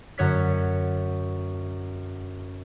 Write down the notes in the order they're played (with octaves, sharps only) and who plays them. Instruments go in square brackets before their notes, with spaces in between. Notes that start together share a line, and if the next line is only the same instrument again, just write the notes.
[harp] F#2 D3 C#5 F#6 B6